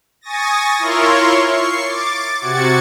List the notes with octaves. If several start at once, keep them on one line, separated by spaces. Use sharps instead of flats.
G#5 C#6 D#6 A6 A#6
E4 F4 A#4 C#5 C6 C#6
C#6 C7
D6 A6
C3 F#4 G#6 A6 C#7